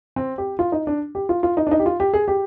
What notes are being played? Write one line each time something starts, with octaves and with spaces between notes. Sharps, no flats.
C4
G4
F4
D#4
D4
G4
F4
F4
D#4
D4
D#4
G4
F4
G4
G#4
G4